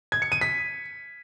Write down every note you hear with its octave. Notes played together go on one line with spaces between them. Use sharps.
G#6
C#7
D#7
B6